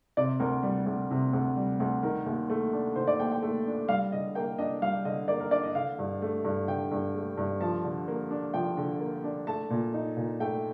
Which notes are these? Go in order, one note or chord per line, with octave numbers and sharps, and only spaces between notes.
C3 D5
D2 A#4
G3
D2
C3
D2
G3
D2
D#3 A#4
D#2
A3
D4
D#3 C5
D5
D#2 G5
G5
A3
D4
G3 F5
D3 D#5
A#3 G5
D4 D#5
G3 F5
D3 D#5
A#3 D5
A#4
D4 D5
D#5
D3 F5
G2
A3
G2
D3 G5
G2
A3
G2
F3 A5
D3
A#3
D4
F3 G5
D3
A#3
D4
A3 A5
A#2
D#4
A#2
A3 G5